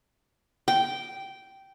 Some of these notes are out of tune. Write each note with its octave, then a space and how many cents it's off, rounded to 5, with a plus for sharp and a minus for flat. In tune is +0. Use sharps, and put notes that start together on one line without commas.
G5 -10